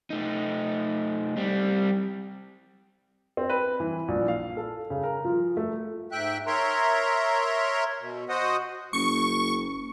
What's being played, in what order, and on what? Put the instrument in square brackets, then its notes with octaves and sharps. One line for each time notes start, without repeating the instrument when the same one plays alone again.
[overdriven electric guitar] A3 D#4
G3 C4
[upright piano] C4
B4
E3
A#1
F5
A4
C#3
A#4
F3
A3
[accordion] G#2 E5 G5 F#6
A#4 C#5 E5 A#5 C6
B2
F#4 C5 D#5 F#5 D#6
[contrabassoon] F#1 [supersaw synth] C#6